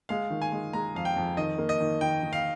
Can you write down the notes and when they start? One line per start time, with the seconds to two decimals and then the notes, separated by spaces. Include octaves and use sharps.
0.09 G#3 F5
0.30 D#3
0.42 G#5
0.52 G#3
0.73 G#3 A#5
0.95 F2 F5
1.05 G5
1.17 F2
1.37 D#3 D#5
1.58 A#3
1.69 D#5
1.80 D#3
2.01 D#3 G5
2.23 D#3
2.33 F5